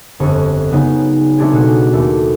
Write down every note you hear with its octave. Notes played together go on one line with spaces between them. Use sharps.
G1 F2 C#6 C#7
C#3 F#3 G#3 B3 C#4 D#4
G#3 A3 C4 D4 G4 G#4
B2 G#3 F#4
D#2 A3